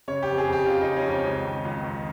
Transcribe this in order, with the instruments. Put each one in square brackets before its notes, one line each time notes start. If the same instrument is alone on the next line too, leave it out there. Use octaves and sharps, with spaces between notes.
[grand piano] C#3 C#5
F2 G4
G#4
F2 G4
C#3 F4
C#3 D#4
C#4
F2
D#4
C#2
D#3
C#2
D#3